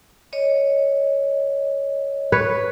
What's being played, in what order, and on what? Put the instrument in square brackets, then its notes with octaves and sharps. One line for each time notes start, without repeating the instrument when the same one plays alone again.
[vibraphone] C#5 D#5
[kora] B4 C#5